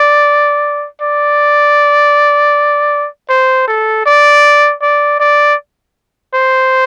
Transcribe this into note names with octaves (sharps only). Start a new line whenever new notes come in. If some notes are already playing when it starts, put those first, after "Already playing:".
Already playing: D5
D5
C5
A4
D5
D5
D5
C5